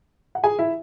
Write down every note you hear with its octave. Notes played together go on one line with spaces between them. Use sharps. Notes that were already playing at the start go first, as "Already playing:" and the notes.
F#5
G#4 G#5
E4 E5